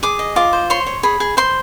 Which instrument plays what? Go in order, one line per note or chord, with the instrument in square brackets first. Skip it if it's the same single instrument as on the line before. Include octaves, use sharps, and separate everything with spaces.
[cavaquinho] G#4 D6
D#5
F4 D6
C5
C#5 C6
C#5
G#4 B5
G#4
C5 C6